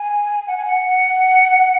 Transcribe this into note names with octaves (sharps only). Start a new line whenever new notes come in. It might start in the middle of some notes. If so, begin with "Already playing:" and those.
Already playing: G#5
F#5
G#5
F#5
F#5